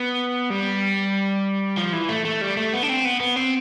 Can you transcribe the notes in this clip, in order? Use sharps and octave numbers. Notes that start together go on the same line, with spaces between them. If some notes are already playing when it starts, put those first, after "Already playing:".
Already playing: B3
G3
F3
E3
A3
A3
G3
A3
B3
D4
C4
B3
B3
C4